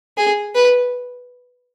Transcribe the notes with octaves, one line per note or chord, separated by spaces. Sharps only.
G#4
B4